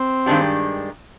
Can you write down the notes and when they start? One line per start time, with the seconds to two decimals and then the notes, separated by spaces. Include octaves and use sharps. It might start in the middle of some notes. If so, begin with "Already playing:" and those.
Already playing: C4
0.26 G2 D#3 G#3 D4 G4